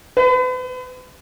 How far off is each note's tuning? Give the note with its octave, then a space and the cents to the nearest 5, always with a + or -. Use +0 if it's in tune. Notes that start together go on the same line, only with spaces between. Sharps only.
B4 +40